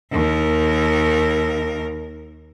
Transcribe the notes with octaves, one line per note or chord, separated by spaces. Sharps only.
D#2 A#4